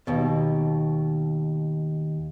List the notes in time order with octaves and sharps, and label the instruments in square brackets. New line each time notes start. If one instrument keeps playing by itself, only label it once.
[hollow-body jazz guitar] D#2 B2